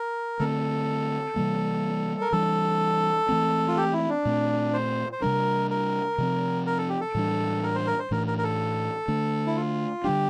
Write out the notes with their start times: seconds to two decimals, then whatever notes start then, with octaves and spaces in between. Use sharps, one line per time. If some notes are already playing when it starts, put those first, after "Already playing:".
Already playing: A#4
0.40 D3 A3 C4 A4
1.36 C3 E3 G3 A#3
2.21 A#4
2.32 E3 G3 D4 A4
3.29 E3 A3 C4
3.68 F4
3.77 G4
3.93 E4
4.10 D4
4.25 A#2 A3 C4
4.73 C5
5.12 C5
5.22 C3 G3 D4 A#4
5.71 A#4
6.18 C3 F3 C4
6.67 A#4
6.78 A4
6.89 G4
7.01 A4
7.15 A2 E3 G3 D4
7.63 A#4
7.75 C5
7.87 A#4
7.99 C5
8.11 A2 E3 A3 D4 A#4
8.27 A#4
8.38 A#4
8.44 A4
9.08 D3 A3 D4
9.47 E4
9.56 F4
10.04 D3 G3 D4 G4